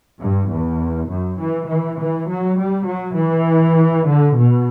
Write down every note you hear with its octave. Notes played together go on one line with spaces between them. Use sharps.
G2
E2
F#2
E3
E3
E3
F#3
G3
F#3
E3
D3
B2